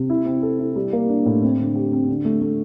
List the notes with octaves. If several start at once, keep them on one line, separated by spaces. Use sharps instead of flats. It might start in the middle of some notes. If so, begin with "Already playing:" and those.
Already playing: C3
E4
C4
A4
E4
G3
A#3
D4
A2
C4
D3
G4
C4
D3
A3
A3